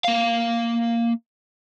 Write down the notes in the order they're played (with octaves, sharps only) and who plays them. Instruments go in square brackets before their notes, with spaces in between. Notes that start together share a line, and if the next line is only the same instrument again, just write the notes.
[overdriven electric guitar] A#3 F5